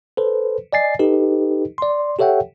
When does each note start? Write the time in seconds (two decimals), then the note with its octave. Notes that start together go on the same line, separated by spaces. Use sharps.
0.17 A4 B4 C5
0.73 D5 D#5 G#5 A6 C7
0.99 D#4 G4 A4 B4 D#5
1.78 D5 C6
2.19 G4 A4 C#5 E5 F#5 G5